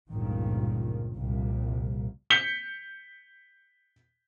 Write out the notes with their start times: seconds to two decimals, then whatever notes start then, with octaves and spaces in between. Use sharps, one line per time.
0.12 G1 C#2 G2 A#2 D#3 F3
1.16 C2 F2 A#2
2.30 G6 B6 C#7 G7